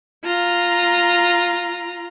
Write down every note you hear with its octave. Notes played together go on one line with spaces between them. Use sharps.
F4 A#5